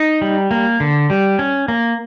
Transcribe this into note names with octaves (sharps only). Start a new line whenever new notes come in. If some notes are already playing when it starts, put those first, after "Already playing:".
Already playing: D#4
G3
A#3
D3
G3
C#4
A#3